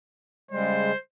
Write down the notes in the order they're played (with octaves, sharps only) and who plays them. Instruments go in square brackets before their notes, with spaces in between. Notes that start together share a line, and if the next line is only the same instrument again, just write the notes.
[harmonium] C#3 G3 G#3 [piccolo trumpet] C5